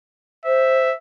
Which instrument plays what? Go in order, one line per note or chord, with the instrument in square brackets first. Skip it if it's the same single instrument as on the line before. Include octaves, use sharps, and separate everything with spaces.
[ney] C5 [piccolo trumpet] E5